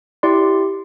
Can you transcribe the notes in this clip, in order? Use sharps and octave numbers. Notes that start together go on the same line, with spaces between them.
E4 G4 D5 C6